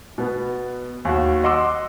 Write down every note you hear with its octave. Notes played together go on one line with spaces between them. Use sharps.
B2 B3
D#2 F#4
D#5 F#5 C6 D6 E6